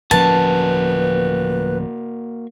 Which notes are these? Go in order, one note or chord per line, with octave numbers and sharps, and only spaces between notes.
D1 F3 A#3 C#4 F#4 B4 A5